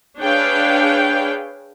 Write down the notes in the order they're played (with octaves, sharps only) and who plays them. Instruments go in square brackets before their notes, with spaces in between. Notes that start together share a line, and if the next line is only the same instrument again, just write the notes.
[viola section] D4 G#4 B4 C#5 F5 G5